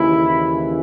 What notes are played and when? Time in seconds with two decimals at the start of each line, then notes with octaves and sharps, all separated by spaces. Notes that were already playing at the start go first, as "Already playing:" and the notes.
Already playing: D#2 C#3 E3 E4